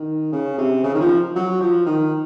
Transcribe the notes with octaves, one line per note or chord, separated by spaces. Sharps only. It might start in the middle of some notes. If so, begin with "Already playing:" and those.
Already playing: D#3
C#3
C3
C#3
D#3
F3
F#3
F3
D#3